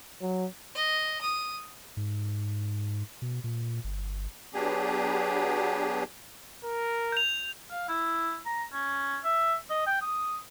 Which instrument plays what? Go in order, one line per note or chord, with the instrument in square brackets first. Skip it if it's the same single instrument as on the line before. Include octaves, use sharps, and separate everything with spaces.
[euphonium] F#3
[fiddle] D#5
D#6
[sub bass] G#2
B2
A#2
G1
[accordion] F#3 B3 D4 G4 G#4
[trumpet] A#4
[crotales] G6 F7
[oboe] F5
E4
A#5
C#4
E5
D#5
G5
D#6